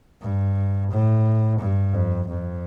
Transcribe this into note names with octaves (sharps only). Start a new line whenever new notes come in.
G2
A2
G2
F2
F2